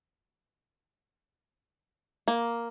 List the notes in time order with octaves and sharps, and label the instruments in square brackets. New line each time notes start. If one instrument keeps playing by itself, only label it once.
[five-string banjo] A#3